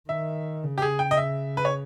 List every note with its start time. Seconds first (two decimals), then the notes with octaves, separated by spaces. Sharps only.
0.09 D#3 E5
0.64 C#3
0.78 G4
0.82 G#4
0.99 G5
1.11 D#5
1.17 E5
1.57 B4
1.65 C#5